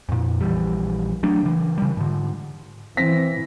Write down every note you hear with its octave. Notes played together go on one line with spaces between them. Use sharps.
F2 A#2
A#1 E3 G3
F#3 A3 D4
C#3 E3
C#3 G3
G#2 D3
E3 C4 A#6 B6